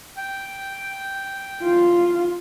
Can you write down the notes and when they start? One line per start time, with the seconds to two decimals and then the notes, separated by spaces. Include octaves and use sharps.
0.17 G5
1.63 F4